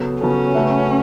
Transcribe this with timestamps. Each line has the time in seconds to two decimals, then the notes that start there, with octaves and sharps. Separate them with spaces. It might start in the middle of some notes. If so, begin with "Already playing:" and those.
Already playing: C#3 F#3 B3 A4
0.20 C#3 F#3 B3 C#4 A4
0.55 C#3 A3 F#4 B4 E5